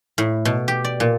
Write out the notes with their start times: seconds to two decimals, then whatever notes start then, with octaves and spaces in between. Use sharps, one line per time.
0.18 A2
0.45 B2
0.68 G4
0.84 D5
1.00 A#2